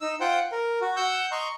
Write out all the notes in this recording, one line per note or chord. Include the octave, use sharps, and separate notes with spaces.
D#4 E6
F4 C5 F#5 G5
A#4
F#4
F#5 E6 G6
D#5 A#5 C6 C#6